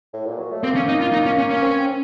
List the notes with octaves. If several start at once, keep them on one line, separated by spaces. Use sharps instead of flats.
A2
A#2
F#3
A3
A#3 C4
C#4
D#4
F4
D#4
C#4
C#4
C#4
C4